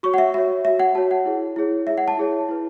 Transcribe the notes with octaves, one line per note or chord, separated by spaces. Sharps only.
F#4 C#5 C#6
F#5
E5
F#4 C#5 E5
F#4 C#5 E5
F#5
F#4 C#5 A5
F#5
E4 G#4 C#5
E4 G#4 C#5
E4 G#4 C#5 E5
F#5
A5
E4 G#4 C#5
E4 B4